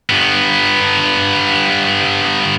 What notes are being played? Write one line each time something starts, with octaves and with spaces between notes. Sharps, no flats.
G2 B3